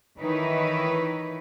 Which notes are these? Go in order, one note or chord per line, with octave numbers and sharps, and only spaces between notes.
D#3 E3 D#4 E4 B4 C#5